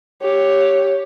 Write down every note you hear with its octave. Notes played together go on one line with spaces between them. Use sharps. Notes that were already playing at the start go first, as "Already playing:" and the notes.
G4 C#5